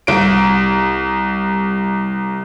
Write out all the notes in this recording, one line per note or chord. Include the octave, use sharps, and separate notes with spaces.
C2 D7